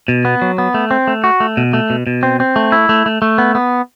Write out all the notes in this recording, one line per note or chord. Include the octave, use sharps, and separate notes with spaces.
B2
B3
F#3
B3
A3
C4
A3
F#4
A3
B2
A3
B2
B2
C4
C4
A3
E4
A3
A3
A3
B3
B3